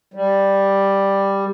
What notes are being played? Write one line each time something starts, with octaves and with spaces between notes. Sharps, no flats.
G3